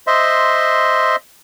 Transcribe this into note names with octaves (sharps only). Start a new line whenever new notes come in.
C5 D#5 E5 C6